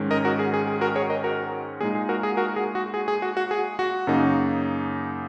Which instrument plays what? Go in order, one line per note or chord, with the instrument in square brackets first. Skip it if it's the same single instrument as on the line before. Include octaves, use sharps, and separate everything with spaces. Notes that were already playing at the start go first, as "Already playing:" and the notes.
Already playing: [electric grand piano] G#2 D#3 G#3 C#4
A#4 D#5
F#4 A#4
G#4
G#4
G#4
F#4 A#4
G#4 C#5
A#4 D#5
F#4 A#4
A#2 G#3 D#4 G#4
G#4
F#4 A#4
G#4
F#4 A#4
G#4
F#4
G#4
G#4
F#4
F#4
G#4
F#4
F#2 C#3 A#3 D#4